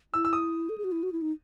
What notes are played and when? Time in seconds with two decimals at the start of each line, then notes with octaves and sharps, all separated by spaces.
0.14 E4 E6
0.25 E6
0.33 D#6
0.69 A4
0.78 G#4
0.84 F#4
0.92 E4
1.03 F#4
1.12 E4
1.22 D#4